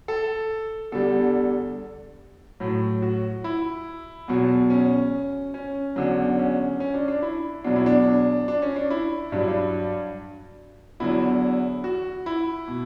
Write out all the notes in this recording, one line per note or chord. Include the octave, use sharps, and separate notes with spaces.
A4
E2 D3 G3 A4
A2 F#3
F#4
E4
E2 B2 F#3
C#4
C#4
E2 D3 F#3
C#4
C#4
D4
D4
E4
E2 B2 F#3 D4
E4
D4
D4
C#4
D4
E4
G2 F#3 D4
E4
D4
E2 D3 F#3 E4
F#4
E4
B2